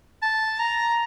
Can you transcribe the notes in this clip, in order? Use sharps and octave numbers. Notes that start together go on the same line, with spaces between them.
A5
A#5